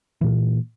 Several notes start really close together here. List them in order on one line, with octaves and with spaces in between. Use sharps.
E3 A#2 A#3